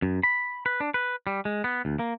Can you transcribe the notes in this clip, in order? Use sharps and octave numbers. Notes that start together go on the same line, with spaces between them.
F#2
B5
B4
D4
B4
G3
G#3
B3
D2
A#3